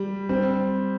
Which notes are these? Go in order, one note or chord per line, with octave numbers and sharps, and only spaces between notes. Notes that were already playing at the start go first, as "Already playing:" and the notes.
Already playing: G3
G3 C4